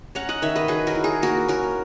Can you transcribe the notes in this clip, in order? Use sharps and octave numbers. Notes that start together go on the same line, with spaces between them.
C#4 F#5 A#5
D#5 F#5
D#3 C#5 E5
B4 D#5
F#3 G#4 B4
F#4 A#4
E4
G#4
A#3 F#4 A#4
C#4 F#4 A#4